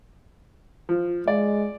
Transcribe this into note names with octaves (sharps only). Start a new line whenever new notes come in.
F3
G#3 D5